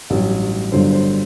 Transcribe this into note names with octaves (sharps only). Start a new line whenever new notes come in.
A1 G2 F#3
G1 G2 D3 F#3 C5
C5